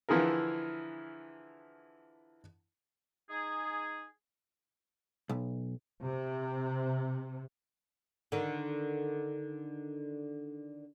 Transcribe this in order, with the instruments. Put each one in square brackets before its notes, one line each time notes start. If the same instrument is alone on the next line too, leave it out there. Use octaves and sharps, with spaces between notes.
[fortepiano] D3 E3 F3 E4 G#4 A#4
[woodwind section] D#4 G#4
[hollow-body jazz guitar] B1
[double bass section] C3
[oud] D3 D#3